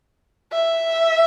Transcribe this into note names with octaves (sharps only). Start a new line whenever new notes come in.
E5